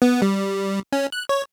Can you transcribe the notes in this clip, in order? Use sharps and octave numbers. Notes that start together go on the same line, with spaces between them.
B3
G3
C#4
F#6
C#5